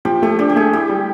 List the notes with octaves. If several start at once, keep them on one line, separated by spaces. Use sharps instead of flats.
F3 G4
A3 G4
D4 G4
G4
A3 G#4
E4 G4
G3